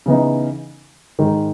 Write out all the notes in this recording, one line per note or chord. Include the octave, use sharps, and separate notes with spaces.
C#3 E3 B3 D#4
G#2 D#3 G#3 D#4